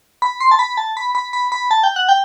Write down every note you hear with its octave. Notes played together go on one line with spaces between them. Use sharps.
B5
C6
A5
B5
A5
B5
B5
B5
B5
A5
G5
F#5
G5